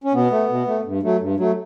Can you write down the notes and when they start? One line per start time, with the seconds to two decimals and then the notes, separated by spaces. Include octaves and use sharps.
0.04 C#4
0.14 B2 B3
0.31 A3
0.49 B2
0.67 A3
0.85 G2
1.03 F#3 A3
1.21 G2
1.37 F#3 A3